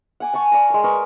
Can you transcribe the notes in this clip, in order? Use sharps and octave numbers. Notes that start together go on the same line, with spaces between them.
F#5 G#5 D6
G#5 A5 C#6
D5 F5 A#5
G#3 A#4
A#4 B4 C#6 D#6